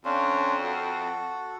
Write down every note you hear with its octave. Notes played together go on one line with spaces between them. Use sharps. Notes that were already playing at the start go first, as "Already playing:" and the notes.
F2 C#4 D4 F4
F#4 A4